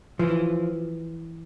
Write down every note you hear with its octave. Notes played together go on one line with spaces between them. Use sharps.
E3 F3